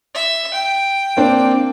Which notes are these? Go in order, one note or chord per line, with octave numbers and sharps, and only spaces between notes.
E5
G5
A#3 C4 D4